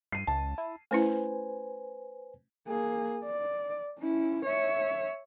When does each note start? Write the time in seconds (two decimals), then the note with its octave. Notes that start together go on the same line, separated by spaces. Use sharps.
0.12 G2 C7 D#7
0.27 C#2 A5
0.58 E4
0.91 A3 C#4 E4 B4 C5 G#5
2.68 A#3 G#4
3.24 D5
3.99 C#4 E4
4.46 C#5 E5